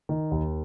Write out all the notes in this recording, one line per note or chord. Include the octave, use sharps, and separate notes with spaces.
D#3
D#2